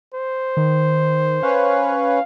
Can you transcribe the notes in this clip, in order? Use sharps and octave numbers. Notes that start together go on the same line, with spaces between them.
C5
D#3
C#4 B4 C#5 F5